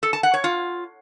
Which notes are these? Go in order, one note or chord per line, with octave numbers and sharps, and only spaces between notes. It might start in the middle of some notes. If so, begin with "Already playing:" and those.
A4
A5
F#5
C#5
F4